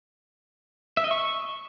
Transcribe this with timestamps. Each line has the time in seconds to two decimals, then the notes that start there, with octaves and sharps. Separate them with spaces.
0.97 E5
1.04 D#5
1.11 C#6